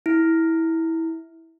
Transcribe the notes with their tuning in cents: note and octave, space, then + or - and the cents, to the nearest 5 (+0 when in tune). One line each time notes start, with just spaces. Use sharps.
E4 -15